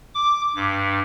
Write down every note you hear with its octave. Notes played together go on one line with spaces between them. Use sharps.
D6
G2